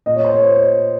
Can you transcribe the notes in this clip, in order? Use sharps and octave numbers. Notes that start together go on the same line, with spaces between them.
A#2 D#5
C#5
C5
C#5